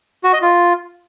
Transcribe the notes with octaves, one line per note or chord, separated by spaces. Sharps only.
F#4
D#5
F4